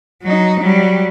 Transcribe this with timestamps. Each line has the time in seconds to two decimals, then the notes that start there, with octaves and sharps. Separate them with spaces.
0.22 F#3 D#4
0.60 F#3 G3